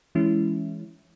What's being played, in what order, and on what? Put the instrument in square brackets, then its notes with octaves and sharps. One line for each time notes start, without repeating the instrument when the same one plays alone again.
[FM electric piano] E3 G#3 C#4 E4